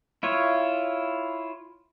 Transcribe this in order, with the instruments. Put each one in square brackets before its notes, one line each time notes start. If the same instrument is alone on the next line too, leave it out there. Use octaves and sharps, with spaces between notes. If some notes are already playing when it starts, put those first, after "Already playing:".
[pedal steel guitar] E4 F4 C#5